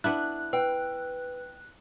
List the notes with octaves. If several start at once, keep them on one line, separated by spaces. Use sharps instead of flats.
B3 D4 E4 F#6
B4 G5